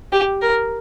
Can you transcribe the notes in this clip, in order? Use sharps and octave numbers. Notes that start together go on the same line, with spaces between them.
G4
A#4